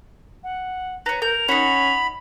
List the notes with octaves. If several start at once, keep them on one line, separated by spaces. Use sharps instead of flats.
F#5
B4 C#5 A#5
A#4 G6 F7
C#4 D#4 F#4 B5